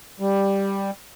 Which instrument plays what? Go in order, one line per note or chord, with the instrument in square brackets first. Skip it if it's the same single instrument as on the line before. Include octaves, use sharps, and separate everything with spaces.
[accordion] G3